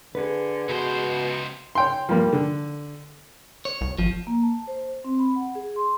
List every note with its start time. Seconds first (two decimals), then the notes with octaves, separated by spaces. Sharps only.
0.15 D3 G#4 B4
0.69 C#2 B2 C5
1.75 C#5 G5 C6
2.09 F3 G3 A#3
2.33 D3
3.65 C#5
3.81 C2
3.98 G#1 F3
4.27 A#3
4.43 A5
4.67 C5
5.04 C4
5.19 B5
5.36 F#5
5.55 G#4
5.76 C6